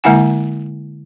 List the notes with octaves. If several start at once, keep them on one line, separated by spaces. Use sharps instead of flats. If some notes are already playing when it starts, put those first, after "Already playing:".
D3 G#3 A#3 E4 F#5 G#5